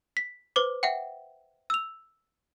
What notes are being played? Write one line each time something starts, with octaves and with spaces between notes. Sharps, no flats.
B6
B4 C5 D6
E5 F#5 G5
E6 F7